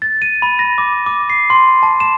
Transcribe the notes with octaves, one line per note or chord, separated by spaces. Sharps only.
A6
D#7
B5
A#6
D6
D6
C7
C6
A5
E7